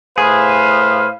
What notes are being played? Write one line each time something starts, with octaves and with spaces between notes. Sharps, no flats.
A2 G#4 B4 C5 F5